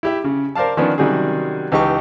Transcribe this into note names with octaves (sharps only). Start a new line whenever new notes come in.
E4 G4 E5
C#3
A#4 C5 D5 F5 A5
D#3 F3 B3 C#4 D4
C3 D#3 F#3 G3 C#4 G#4
C#2 E3 D#4 G4 C#6